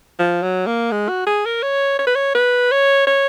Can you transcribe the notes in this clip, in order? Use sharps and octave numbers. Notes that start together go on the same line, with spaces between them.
F3
F#3
A#3
G#3
F#4
G#4
A#4
C#5
C#5
B4
C#5
B4
C#5
C#5